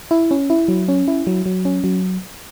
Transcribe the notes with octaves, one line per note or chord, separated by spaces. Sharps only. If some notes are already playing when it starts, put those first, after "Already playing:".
E4
C#4
E4
F#3
C#4
E4
F#3
F#3
C#4
F#3